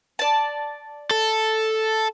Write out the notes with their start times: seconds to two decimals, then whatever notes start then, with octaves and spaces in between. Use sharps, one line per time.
0.19 D5 A5
1.11 A4